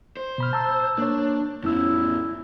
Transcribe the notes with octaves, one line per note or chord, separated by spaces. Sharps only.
C5
B2 B5 F6
A5 A#5 E6
A#3 D4 C#5
F2 A2 B3 C#4 E4 E6